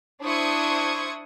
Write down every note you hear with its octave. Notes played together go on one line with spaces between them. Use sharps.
D4 E4 C5 C#6 D#6 G#6